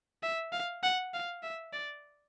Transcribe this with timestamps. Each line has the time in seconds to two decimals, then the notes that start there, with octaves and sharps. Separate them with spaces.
0.23 E5
0.53 F5
0.83 F#5
1.14 F5
1.43 E5
1.73 D5